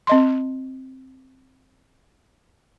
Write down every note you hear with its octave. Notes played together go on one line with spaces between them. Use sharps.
C4 D#5 C6